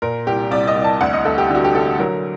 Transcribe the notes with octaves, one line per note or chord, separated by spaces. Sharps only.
A#2 A#4
C2 G4
C2 D5
D#5
C2
A5
D2 F#5
D#5
D2 A4
G4
D3 F#4
G4
D3 A4
F#3 A#4